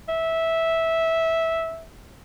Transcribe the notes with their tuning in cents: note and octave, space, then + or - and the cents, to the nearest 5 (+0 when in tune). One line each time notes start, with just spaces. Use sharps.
E5 -10